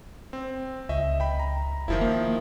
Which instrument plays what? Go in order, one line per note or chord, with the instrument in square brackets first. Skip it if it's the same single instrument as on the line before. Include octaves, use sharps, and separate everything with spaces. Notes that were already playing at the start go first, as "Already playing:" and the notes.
[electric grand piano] C4
[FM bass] C#2 [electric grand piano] D#5 E5
[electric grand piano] G5 B5
A#5
[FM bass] F1 [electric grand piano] D#3 F3 E4
[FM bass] A#3